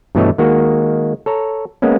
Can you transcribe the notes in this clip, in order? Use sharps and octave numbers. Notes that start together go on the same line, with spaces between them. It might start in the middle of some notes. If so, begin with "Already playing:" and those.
G2 B2 E3 A3 C#5 D#5
D#3 G#3 A#3 F#4
A4 C#5 A#5
G#3 A#3 B3 C#4